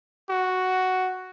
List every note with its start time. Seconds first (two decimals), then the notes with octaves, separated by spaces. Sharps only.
0.30 F#4